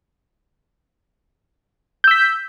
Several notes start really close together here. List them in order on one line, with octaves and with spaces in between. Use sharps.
G6 E6 B6